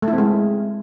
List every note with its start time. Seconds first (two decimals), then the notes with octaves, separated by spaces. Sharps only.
0.02 A3
0.08 E4
0.13 C4
0.18 G#3